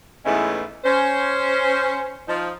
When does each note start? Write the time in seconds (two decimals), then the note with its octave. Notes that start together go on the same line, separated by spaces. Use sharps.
0.25 E2 G#2 E3 G#3 A3 C#4
0.84 C#4 C5
2.28 F3 D#4